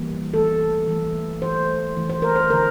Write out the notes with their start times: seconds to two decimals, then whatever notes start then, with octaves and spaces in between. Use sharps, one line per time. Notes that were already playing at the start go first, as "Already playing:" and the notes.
Already playing: E3 G3 A#3
0.34 E3 A3 A4
0.88 E3 A3
1.42 E3 A3 C5
1.97 E3 A3
2.10 C5
2.22 A#4
2.36 C5
2.50 D3 A3 A#4